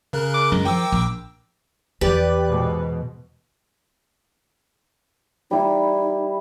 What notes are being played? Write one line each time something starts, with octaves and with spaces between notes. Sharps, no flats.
C#3 A#4 F#6
D6
F#2 G#3 A#4
D#3 F3 G5 D6 E6
A#1
E2 E3 G4 B4 D5
G#2 B2
G3 D#4 E4